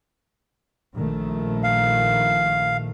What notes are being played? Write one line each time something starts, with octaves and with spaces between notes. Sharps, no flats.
A#1 D#3 A3
F5